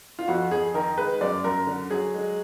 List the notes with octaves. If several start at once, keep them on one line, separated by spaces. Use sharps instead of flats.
F4
F2 F#4
F2 G#4
D#3 A#4
G#3 B4
F#2 D5
F#2 A#4
D3
F#3 G#4
G#3